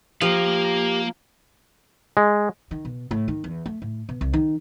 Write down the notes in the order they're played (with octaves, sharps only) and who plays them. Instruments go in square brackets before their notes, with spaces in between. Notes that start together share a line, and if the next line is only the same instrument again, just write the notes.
[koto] F3 [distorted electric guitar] A#3 F5 [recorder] G4
[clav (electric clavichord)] G#3
[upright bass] D#3
B2
A2
D#3
E2
A3
A2
B2
C2
D#3